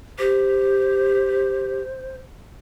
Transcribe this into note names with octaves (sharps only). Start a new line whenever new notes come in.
G4 C5